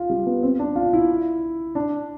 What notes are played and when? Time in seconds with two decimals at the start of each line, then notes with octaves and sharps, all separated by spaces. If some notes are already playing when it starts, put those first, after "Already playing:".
Already playing: F4
0.10 G3
0.26 B3
0.43 C4
0.59 D4
0.76 F4
0.93 E4
1.75 D4